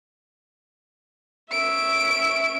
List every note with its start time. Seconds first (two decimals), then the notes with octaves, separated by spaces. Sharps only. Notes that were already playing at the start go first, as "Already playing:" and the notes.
1.51 C#4 E5 D7